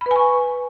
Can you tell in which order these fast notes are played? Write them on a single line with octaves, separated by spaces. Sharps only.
B5 B4 G#5 C#6